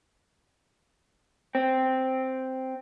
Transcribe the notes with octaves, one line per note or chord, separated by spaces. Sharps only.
C4